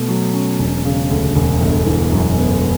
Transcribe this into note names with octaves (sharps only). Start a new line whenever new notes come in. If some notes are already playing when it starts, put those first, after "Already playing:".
Already playing: B2 A3
F#3
C#4
E1
C#3
D2
E1
G1
E3
F#2
B3